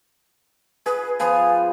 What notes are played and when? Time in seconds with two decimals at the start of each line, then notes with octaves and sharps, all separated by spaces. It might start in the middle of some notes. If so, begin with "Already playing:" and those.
0.86 G#4 B4
1.20 F3 B3 G#5